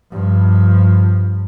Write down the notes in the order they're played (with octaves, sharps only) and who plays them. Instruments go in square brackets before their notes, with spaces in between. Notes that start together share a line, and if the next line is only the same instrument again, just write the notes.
[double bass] G2 F3